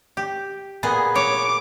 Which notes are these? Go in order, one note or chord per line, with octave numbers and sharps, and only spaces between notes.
G4
A#2 B3 G#4
C#5 D6